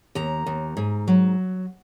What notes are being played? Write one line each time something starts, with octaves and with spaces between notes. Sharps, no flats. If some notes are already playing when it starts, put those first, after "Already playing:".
D#2 A#5
D#2
G#2
F#3